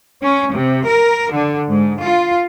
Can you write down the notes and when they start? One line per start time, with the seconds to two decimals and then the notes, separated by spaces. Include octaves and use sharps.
0.25 C#4
0.54 C3
0.88 A#4
1.33 D3
1.70 G#2
2.03 F4